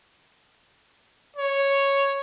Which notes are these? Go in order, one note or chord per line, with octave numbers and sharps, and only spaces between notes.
C#5